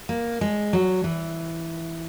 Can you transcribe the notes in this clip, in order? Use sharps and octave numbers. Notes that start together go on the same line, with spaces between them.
A#3
G#3
F#3
E3